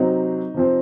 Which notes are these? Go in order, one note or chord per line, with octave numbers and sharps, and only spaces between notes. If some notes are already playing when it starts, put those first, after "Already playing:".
Already playing: C3 F#3 C4 D#4
C3 F3 C4